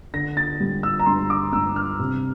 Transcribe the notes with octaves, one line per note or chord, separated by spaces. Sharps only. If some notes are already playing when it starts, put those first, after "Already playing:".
D3 A#6
A6
G3
E6
A#5
G2 C6
D6
G2 E6
F6
C3